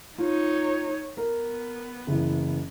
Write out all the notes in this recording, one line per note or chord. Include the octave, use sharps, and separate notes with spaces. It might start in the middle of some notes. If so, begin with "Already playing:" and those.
D#4 F4 C#5
B3 A#4
F#1 E3